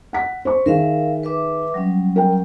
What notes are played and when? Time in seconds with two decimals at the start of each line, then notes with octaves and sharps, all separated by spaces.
0.13 F#5 B6
0.45 C5 C#6
0.66 D#3 G#4 A#4 E5 F5
1.23 B4 E5 D6
1.74 F#3 G3 C#4
2.16 A#4 G5